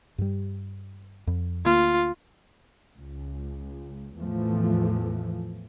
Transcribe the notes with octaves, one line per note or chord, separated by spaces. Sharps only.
G2 G3
F2
D2 A#3 F4
C#2
E2 A2 E3 F3 A3